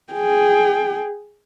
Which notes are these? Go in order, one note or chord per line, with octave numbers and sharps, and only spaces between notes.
G#4 G5